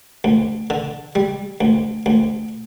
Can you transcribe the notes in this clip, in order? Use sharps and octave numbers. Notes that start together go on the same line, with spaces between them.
D2
D3
G3
D2
D2